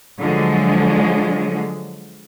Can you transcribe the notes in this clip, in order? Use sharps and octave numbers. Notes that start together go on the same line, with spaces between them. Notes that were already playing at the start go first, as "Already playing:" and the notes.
D3 F3 F#3 G#3